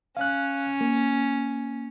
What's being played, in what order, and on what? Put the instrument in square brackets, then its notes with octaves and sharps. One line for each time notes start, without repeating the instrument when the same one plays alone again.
[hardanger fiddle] C#4 [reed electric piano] F5 F#6
[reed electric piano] A#3